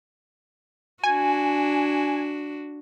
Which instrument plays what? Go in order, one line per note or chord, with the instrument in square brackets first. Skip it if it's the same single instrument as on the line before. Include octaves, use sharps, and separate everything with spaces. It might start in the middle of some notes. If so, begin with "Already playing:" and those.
[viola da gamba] D4 F#4 [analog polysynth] G#5